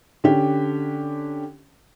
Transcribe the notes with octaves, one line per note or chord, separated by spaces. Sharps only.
D3 C#4 G4